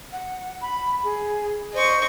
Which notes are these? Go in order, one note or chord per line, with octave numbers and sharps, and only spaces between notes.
F#5
B5
G#4
C5 D#5 C#6